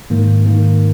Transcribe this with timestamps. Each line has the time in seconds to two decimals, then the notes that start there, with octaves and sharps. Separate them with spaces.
0.10 G#2 D#3 A#3
0.46 D#3 A#3